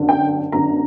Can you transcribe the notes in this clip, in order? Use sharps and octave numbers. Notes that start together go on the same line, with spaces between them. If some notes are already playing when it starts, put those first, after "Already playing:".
Already playing: G1 F#2 D3
G5
G1 F#2 D3 A#5